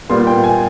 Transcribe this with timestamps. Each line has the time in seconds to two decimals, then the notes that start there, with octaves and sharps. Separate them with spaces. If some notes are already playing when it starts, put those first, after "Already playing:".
0.10 A#2 G3 B3 C6
0.27 G5
0.44 G#5